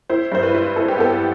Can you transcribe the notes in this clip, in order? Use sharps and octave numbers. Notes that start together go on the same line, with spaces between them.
E4 C5
G2 C5
B4
E4
E4 A4
G4
B3 A4